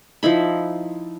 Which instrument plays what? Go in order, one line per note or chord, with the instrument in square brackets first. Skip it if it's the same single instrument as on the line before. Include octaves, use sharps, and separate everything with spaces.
[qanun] F3 D#4 E4 B5